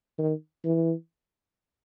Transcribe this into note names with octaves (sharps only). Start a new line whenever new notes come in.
D#3
E3